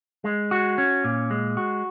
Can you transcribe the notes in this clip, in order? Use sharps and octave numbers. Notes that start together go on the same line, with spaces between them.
G#3
F#4
C#4
A#2
G#3
F#4